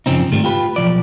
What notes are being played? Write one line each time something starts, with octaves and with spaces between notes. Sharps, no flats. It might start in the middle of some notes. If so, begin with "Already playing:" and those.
F#2 C#3 F3 C4 D#4
G#2 D#3 G3 A3
F4 G4 B4
B1 F3 D5